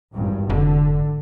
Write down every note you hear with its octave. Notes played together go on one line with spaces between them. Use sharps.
G#1 E2 G2
F1 D3